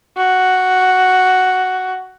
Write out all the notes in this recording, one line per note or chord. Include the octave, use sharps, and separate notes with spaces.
F#4